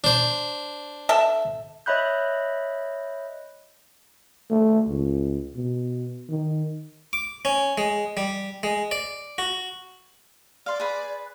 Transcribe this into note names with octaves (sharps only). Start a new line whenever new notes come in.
D4 C5
A4 E5
C#5 D#5 E5 B5 F#6 G6
A3
C#2
B2
D#3
D6
C#4
G#3
G3
G#3
D5
F#4
D5 F5 C6
G#4 B4